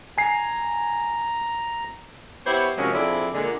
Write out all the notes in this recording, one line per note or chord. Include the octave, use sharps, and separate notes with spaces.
G#5 A#5 C7
B3 E4 G4 C5 C#5
C3 D#3 F3 F#3 G#3 C#4
F3 C4 D4 E4 G#4 A4
A#2 D3 G#3